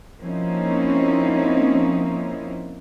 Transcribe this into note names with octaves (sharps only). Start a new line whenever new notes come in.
F3 A#3 C4 C#4 D#4 E4